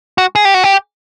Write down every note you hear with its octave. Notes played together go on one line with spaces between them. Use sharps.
F#4
G#4
G4
F#4
G4